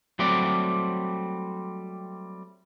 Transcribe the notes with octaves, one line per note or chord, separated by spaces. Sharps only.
F#3 G3 A3 C4 D5